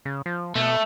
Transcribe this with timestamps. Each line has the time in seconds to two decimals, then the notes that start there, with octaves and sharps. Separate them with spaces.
0.05 C#3
0.26 F3
0.55 B2 A3